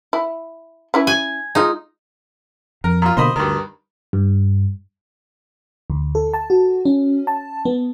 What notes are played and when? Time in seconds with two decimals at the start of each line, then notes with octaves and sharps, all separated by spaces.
0.13 E4
0.94 C#4 E4 B4
1.07 G#5
1.55 G#3 D#4 F4
2.84 F2 A#4
3.02 A#2 F4
3.17 B2 D3 A#3 C5 D#5 B5
3.36 D2 G2 D#3
4.13 G2
5.90 D2
6.15 A4
6.34 A5
6.50 F#4
6.85 C#4
7.27 A5
7.65 B3